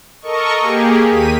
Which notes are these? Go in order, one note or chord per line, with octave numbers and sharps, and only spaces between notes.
A4 A#4 D#5 C#6
A#3 G4 G#4
D#2 B6 D#7